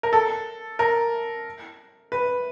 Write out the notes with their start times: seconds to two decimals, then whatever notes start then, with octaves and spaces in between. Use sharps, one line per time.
0.03 A#4
0.13 A4
0.79 A#4
2.12 B4